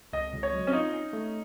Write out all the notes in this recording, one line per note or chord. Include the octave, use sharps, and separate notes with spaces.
C#2 D#5
C#2
C#5
F#3
C#4
D#4 F4
C#4
A3